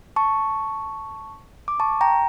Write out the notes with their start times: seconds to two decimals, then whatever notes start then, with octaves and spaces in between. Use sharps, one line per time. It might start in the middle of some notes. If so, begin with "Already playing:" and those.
0.16 A5 C#6
1.68 D6
1.80 A5 C#6
2.01 G5 A#5